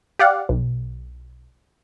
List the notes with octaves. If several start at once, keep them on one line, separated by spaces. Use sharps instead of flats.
G4 D5 F5 F#5
B1